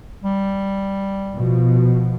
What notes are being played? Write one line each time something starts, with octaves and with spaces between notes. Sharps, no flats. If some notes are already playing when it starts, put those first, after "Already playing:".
G3
B2 F3